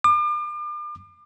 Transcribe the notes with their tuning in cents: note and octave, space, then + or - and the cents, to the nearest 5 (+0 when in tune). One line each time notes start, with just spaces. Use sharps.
D6 +40